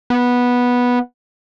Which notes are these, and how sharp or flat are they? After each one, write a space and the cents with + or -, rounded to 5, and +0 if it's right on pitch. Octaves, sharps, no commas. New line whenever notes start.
B3 -10